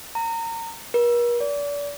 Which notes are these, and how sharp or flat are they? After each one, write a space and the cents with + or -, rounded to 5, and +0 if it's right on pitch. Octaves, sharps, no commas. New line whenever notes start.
A#5 -25
A#4 +45
D5 -35